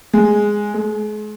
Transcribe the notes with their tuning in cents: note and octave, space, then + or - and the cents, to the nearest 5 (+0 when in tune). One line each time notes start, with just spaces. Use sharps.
G#3 -5
G#3 +35